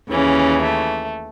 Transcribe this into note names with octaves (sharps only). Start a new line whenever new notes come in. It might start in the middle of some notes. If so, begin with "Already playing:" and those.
D#2 C#3 E3 C#4
A3